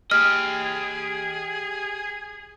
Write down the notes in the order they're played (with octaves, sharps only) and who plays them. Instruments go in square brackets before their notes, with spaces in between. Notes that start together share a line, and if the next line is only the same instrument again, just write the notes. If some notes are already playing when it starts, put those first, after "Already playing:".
[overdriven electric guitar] G4 D#5 [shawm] G#4 [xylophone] F6